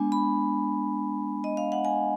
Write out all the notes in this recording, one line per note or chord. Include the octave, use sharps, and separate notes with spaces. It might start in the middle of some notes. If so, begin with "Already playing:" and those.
Already playing: G#3 B3 D4 G#5
B5
D#5
F5
F#5
G#5